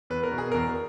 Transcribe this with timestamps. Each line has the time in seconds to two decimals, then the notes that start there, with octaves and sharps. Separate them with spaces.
0.10 E2 B4
0.23 A#4
0.32 B2
0.38 G#4
0.52 E2 A#4